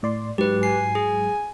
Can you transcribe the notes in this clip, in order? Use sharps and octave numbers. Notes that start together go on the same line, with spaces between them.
A2 D5 C6
G#2 F#3 G4 B4
G#5 C7
G#4